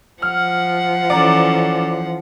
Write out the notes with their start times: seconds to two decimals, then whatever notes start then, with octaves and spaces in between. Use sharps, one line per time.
0.22 F3 F#5 F6
1.10 E3 C#4 A4 D5 A#5 D6